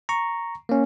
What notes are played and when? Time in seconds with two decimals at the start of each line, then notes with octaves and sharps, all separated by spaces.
0.09 A#5 C#6
0.69 A#3 C#4